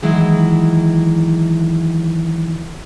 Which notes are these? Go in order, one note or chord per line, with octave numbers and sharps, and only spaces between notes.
D#3 E3 F#3 G#3 E4